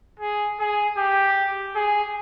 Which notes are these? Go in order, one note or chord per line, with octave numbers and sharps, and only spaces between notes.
G#4
G#4
G4
G#4